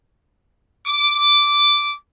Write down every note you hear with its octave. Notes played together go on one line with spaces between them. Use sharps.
D6